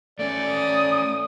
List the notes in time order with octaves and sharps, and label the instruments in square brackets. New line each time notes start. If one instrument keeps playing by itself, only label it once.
[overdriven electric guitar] A3 C#4 [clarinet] D5
[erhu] D#6